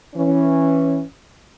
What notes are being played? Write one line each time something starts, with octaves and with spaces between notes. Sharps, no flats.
E3 C#4